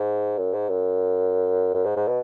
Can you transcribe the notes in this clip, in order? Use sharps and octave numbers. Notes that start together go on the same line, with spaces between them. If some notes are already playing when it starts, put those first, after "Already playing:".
Already playing: G#2
F#2
G#2
F#2
F#2
G#2
G#2
B2